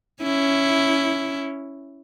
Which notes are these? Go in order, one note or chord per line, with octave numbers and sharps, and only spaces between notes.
C#4 E4